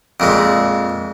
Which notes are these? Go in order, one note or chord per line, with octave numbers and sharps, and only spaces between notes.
F2 A#2 G#3